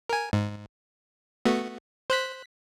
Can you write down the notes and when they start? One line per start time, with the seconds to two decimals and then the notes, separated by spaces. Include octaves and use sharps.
0.09 A#4 G#5
0.33 G#2
1.45 A3 B3 F#4
2.10 C5 F#6 B6